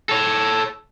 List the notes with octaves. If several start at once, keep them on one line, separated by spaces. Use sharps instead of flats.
A4 C#5